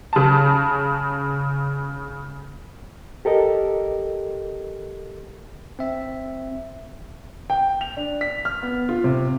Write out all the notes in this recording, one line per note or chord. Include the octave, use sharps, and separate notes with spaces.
C#3 A5
G4 A4 A#4 D#5
C4 E5
G5
F7
D4
B6
F6
B3
F4
C3